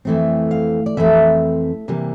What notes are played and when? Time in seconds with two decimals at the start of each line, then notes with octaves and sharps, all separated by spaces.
0.05 F2 E3 A3 C4
0.51 F5
0.86 D5
0.97 F2 E3 A3 C4 E5
1.88 C3 E3 G3 A#3